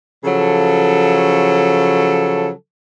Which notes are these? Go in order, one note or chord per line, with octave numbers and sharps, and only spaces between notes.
C#3 F3 F#3 A4